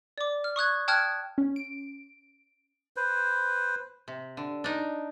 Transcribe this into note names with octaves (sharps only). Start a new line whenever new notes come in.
D5 D6
F6
C#6 D#6 F#6 G#6
G5 A5 D#6 F6 F#6 G#6
C#4
D7
B4 C5
C3
D3
D4 D#4